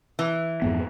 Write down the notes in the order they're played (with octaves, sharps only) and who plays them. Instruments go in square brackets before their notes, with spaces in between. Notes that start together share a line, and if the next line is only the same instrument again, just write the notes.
[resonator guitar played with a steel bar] E3
[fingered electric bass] F2 G#2 B3